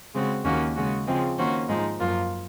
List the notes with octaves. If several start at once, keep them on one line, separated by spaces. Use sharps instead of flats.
C#3 G#3 C4 F#4
D#2 D#3 A#3 C#4 F#4
C#3 G#3 C#4 F#4
C#3 F3 G#3 C4
D#3 A#3 C#4 F#4 C5
G#2 F3 G#3 D#4
F#2 F3 A#3 F4